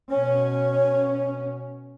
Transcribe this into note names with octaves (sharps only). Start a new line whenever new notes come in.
B2 C#4 C#5